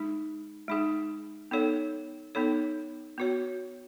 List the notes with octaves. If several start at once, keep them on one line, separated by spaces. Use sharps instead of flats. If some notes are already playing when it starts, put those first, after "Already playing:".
Already playing: G#3 D#4 G#4
G#3 D#4 G#4
B3 D#4 A4 C#5
B3 D#4 A4 C#5
B3 F#4 C#5